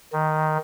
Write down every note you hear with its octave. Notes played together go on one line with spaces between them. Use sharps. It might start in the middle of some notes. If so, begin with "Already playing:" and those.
D#3